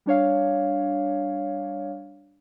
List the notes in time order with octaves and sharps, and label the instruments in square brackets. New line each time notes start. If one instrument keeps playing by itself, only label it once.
[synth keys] G3 D4 C#5 F5